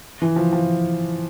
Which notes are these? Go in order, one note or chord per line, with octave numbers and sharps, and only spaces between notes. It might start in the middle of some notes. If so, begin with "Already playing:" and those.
E3
F3
F3